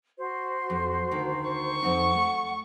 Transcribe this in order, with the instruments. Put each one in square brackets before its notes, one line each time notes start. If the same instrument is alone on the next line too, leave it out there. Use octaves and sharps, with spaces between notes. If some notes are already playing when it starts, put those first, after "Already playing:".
[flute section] F#4 C5
[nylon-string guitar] F2
D2 D#3
[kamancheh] C#6
[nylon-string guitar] F2 C4 D#4 [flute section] F#5
[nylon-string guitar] A3